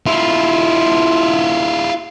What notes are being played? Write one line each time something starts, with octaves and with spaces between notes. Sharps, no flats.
E4 F4